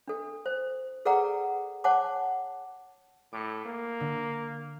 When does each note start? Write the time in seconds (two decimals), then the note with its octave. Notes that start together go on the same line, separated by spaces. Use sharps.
0.08 D4 A4
0.46 C5
1.05 G#4 A4 B4 D5 F#5 A#5
1.84 C#5 F#5 G#5 A5 D6
3.33 A2 D6 C#7
3.65 A#3
4.00 D3